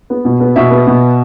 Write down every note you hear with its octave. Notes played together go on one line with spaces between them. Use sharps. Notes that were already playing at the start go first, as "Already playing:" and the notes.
B3
B2
B3
B2 E5
B3
B2